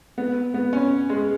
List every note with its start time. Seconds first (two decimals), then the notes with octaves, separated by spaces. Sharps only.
0.18 B3
0.54 B3
0.73 C#4
1.09 G#3